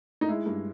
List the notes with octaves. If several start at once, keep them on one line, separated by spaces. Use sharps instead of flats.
D#4
G#3 E4
G2